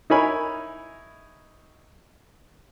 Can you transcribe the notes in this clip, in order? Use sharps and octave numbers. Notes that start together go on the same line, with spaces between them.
D#4 E4 A#4 C#5 G#5 B5